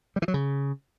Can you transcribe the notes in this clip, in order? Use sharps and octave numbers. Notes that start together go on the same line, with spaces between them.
G3
E3
F#3
C#3